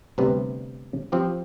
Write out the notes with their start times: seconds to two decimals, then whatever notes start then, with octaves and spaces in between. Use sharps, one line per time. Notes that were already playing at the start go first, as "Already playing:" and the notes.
0.18 D2 C3 G3 B3
1.12 F3 C4 G4